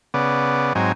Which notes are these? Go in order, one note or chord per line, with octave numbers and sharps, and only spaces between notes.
C#3 B3 D5
G#2 F#3 C4 D#4 G#5